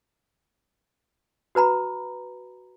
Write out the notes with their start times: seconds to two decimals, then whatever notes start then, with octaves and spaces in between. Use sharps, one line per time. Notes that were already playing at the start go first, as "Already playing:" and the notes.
1.55 F#4 B4 A#5 B5